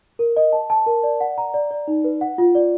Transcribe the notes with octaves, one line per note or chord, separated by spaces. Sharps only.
A#4
D#5
A5
A5
A#4
D5
F#5
A#5
D5
D5
D#4
B4
F#5
F4
D5